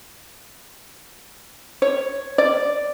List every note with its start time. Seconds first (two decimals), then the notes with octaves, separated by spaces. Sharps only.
1.82 C#5
2.38 D5